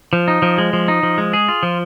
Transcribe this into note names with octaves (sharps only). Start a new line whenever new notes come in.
F3
D#4
F3
G#3
F3
D#4
F3
G#3
G#4
F4
F3